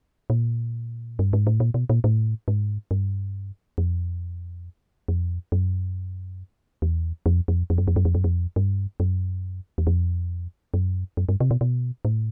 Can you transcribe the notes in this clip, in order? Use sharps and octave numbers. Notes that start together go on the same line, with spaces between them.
A#2
G2
G#2
A2
A#2
B2
A#2
A2
G#2
G2
F2
F2
F#2
E2
F2
F2
F2
F#2
F2
F#2
F2
F#2
F2
G2
F#2
E2
F2
F#2
F#2
G2
C3
B2
B2
A2